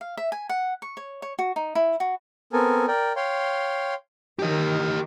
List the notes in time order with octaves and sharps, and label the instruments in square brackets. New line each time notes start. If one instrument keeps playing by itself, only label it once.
[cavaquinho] F5
E5
G#5
F#5
C#6
C#5
C#5
F#4
D#4
E4
F#4
[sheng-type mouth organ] B3 C4 A4 A#4 G#5
A#4 D5 G5
C#5 F5 G5 C6
[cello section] D#3 [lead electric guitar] G4 D#5